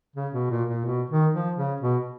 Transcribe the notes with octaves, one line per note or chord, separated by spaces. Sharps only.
C#3
B2
A#2
A#2
B2
D#3
F3
C#3
B2